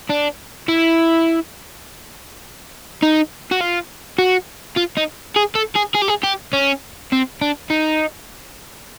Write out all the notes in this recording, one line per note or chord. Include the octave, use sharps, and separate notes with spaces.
D4
E4
D#4
F#4
F4
F#4
F4
D#4
G#4
A4
G#4
G#4
G4
G#4
G4
C#4
C4
D4
D#4